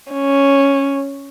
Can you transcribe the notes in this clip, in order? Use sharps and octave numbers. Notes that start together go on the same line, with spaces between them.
C#4